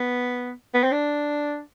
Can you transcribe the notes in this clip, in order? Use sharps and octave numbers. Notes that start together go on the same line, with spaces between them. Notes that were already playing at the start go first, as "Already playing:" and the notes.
Already playing: B3
B3
C4
D4